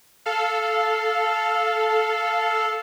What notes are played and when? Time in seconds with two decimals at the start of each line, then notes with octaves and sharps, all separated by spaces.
0.26 A4 F5